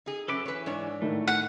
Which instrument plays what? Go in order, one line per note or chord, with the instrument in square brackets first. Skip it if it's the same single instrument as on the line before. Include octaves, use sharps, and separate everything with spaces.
[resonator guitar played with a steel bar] D#4 G#4
[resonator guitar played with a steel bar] F#2 C#4 [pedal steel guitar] A4 B4 D6
[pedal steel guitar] E3 [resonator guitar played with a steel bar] B4 C#5
[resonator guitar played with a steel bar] G#2 D4 C#5
[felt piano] A2 D#3 [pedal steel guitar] A3
[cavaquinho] F#5